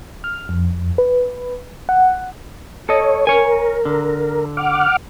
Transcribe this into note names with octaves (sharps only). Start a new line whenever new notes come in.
F6
F2
B4
F#5
A4 C#5 D#5
A#4 C#5 G#5
D3
F#5 D6 F6